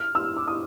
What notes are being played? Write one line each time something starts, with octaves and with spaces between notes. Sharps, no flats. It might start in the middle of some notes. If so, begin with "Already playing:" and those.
Already playing: F6
E6
D6
D#6